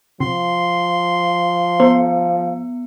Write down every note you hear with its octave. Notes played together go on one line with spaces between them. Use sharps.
C3 F3 C6
B3 C5